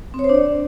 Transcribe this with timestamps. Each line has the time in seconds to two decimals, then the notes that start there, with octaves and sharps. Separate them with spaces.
0.14 C4
0.19 C#5
0.24 C5
0.29 D4
0.35 D5